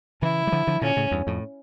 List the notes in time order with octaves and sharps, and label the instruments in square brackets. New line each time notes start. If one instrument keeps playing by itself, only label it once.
[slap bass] C#3 E3 [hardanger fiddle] E4
[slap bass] G3
D3 F3
D3 F3
[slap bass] A#2 D3 [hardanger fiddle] C#4
[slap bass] A2 C#3
E2 G2
F2 A2